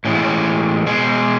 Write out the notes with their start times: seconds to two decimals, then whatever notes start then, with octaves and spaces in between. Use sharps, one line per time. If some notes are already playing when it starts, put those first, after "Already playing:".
0.05 A2 E3 G#3 C#4
0.15 B3
0.23 C#4
0.86 B2 G#3 G#4